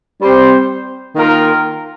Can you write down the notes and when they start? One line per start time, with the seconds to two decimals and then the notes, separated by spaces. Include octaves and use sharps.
0.21 G3 C4 G4 C5
1.15 D#3 A#3 F4 A#4